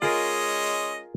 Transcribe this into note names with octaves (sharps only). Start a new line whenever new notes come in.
G#3 C#4 F4 G#4 A#4 D#5